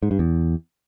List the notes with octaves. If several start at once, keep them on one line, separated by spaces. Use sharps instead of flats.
G#2
G2
E2